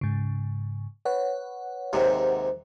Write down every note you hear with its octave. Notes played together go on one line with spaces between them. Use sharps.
G#2 C#3
B4 C#5 F#5
D#2 G#2 C3